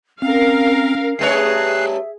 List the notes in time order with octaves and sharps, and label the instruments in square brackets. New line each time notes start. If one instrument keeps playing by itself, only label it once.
[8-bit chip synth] C4 [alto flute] C#4 [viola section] A#4 F5
[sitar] G2 A3 C#5 [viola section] G#4 [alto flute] E5 [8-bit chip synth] F#6 C7